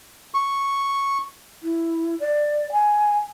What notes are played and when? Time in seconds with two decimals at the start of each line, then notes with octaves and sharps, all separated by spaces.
0.34 C#6
1.63 E4
2.20 D5
2.72 G#5